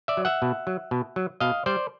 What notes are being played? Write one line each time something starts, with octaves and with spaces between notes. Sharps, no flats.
D5 E5
F#3
E5 F#5
B2
F#3
B2
F#3
B2 D#5 F5
G3 C5 D5